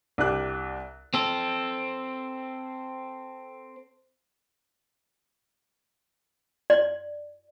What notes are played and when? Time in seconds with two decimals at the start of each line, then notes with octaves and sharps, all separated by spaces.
0.18 C2 D4 G4 F#6
1.14 C4 A4
6.70 D5